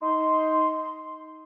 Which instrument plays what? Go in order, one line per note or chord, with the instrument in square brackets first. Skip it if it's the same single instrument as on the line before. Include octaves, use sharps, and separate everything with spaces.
[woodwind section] D#4 C6